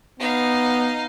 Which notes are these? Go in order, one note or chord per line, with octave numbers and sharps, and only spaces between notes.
B3 D#4 F5